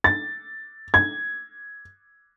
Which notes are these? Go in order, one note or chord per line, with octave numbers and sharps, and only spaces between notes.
A6
G#6